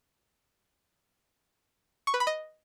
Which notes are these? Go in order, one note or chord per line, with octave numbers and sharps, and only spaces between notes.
C#6
B4
B5
D#5